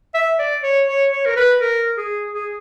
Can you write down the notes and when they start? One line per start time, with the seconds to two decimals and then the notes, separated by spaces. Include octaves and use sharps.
0.14 E5
0.39 D5
0.63 C#5
0.88 C#5
1.12 C#5
1.26 A#4
1.36 B4
1.61 A#4
1.97 G#4
2.34 G#4